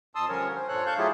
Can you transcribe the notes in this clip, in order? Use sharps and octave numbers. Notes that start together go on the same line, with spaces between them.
F2 A5 C6 D#6 E6
D3 F3 G3 C#4 A#4 C#5
C5
G2 A#2 A4 C5 C#5 F#6
F5 A5 C#6 F#6 G6
F#3 A3 E4 F4 G4 G#4